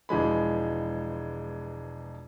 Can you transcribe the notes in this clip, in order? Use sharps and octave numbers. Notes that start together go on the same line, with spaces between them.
E1 E3 F3 G#3 B5